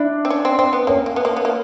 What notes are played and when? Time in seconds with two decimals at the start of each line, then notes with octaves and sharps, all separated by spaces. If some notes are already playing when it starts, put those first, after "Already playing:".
Already playing: D4 E4
0.25 C4
0.30 C#4
0.45 C4
0.59 C4
0.73 B3
0.87 A#3 C#4
1.06 A#3
1.16 B3
1.25 A#3
1.37 B3
1.45 A#3